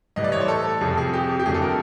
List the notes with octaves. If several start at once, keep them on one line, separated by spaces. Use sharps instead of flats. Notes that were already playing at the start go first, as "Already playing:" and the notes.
A2 E3 G3 D#5
D5
C#5
C5
A4
F2 C3 F3 G#4
G#4
G4
G4
F2 D3 F#3 A3 G#4
A4
A#4